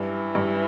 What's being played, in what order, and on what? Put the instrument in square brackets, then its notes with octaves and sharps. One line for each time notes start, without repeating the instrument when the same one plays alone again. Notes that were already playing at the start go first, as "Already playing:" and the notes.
Already playing: [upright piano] G2 [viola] E3
[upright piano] G2